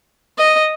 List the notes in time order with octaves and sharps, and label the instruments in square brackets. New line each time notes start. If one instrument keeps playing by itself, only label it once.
[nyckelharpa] D#5